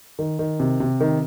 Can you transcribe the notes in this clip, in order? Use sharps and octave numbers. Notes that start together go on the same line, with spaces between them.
D#3
D#3
C3
C3
D#3